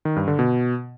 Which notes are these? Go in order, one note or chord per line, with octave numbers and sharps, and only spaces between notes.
D#3
G2
D3
B2